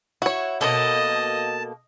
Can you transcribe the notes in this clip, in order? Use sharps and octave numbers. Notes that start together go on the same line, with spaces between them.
E4 F#4 C#5
B2 A#3 A4 D#5 A5